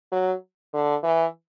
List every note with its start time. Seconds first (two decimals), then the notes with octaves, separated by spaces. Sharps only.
0.12 F#3
0.74 D3
1.03 E3